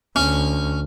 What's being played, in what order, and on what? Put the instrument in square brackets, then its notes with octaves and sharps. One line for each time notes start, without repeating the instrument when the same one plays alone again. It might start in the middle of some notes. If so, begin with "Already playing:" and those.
[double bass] D2 [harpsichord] C#4